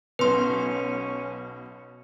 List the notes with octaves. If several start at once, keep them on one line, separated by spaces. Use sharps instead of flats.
B1 B2 C#4 B4 C6